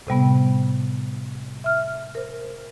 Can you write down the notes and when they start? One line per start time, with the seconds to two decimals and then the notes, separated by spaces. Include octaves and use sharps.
0.07 A2 C3 G3 B3
1.64 E5 F6
2.15 A#4 C5